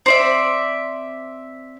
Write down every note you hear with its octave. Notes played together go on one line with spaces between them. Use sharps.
C4 D5 E5